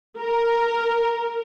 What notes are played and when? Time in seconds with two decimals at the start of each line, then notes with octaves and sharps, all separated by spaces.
0.18 A#4